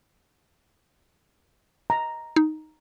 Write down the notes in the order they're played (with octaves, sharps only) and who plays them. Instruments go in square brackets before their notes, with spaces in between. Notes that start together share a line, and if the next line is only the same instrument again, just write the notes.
[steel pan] A#5
[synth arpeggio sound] D#4